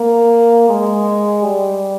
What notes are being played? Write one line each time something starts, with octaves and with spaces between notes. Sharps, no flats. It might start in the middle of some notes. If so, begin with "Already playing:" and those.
Already playing: A#3
G#3
G3